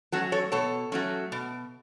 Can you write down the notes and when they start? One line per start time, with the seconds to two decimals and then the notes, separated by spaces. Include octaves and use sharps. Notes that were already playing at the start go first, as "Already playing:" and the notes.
0.12 F#3 A3 C#4 F#4 A4
0.32 A4 C#5
0.52 B2 A4 C#5
0.92 F#3 A3 C#4
1.32 B2